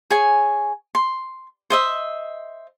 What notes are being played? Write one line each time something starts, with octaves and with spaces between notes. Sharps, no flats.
G#4 C#5 G#5
C6
C5 D#5 E5